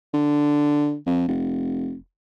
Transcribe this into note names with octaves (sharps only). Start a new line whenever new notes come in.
D3
F2
F1